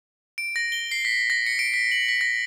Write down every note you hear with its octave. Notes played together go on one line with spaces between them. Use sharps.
D7
A#6
G7
C7
B6
A#6
C#7
D7
B6
F#7
B6
A#6